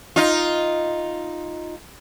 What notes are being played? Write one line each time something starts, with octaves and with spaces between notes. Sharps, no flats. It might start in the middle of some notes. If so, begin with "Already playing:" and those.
D#4 F4